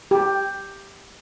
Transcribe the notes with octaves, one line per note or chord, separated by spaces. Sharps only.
G4